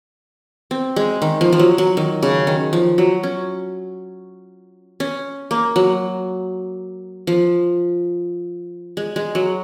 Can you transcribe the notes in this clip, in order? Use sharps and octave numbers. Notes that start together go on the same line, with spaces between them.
C4
G#3
D#3
F3
F3
F#3
F#3
D#3
C#3
D#3
F3
F#3
C#4
C#4
A#3
F#3
F3
G#3
G#3
F#3